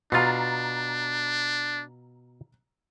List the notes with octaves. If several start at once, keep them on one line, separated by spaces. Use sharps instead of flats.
B2 D4 F4 A#5 A6 C7